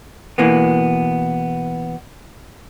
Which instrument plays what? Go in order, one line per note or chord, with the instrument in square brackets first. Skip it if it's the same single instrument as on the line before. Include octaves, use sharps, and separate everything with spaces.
[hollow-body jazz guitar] B2 E3 A#3 B3